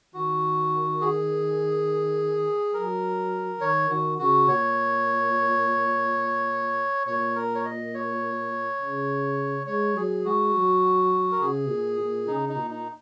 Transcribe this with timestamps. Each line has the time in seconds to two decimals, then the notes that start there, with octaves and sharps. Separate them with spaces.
0.14 D#3 F#4
1.01 G#4
2.74 F#3 A#4
3.60 D#3 C#5
3.89 D#3 F#4
4.19 C#3 F#4
4.48 A#2 C#5
7.07 A#2 C#5
7.36 A#4
7.55 C#5
7.65 D#5
7.94 C#5
8.80 C#3
9.67 G#3 C#5
9.96 F#3 G#4
10.25 G#3 F#4
10.55 F#3
11.32 A#4
11.41 C#3 G#4
11.69 A#2
11.99 A#2
12.27 C#3 D#4
12.49 D#4
12.56 A#2
12.71 D#4